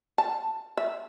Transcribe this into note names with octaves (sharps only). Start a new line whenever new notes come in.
A5
E5